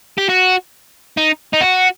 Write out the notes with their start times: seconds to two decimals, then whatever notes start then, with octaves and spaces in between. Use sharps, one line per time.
0.18 G4
0.29 F#4
1.17 D#4
1.53 D#4
1.61 F#4